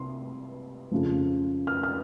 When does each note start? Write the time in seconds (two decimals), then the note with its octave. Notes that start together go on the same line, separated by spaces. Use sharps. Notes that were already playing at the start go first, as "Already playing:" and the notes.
Already playing: C2 C3 C6
0.91 F2 C#3 F3
1.67 F6
1.83 F6